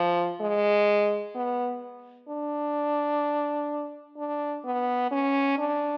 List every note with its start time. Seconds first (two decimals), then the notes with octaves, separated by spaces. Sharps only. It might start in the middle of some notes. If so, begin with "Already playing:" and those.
Already playing: F3
0.40 G#3
1.35 B3
2.29 D4
4.17 D4
4.64 B3
5.11 C#4
5.58 D4